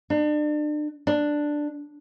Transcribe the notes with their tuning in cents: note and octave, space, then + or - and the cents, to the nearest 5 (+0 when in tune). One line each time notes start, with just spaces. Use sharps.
D4 +35
D4 +5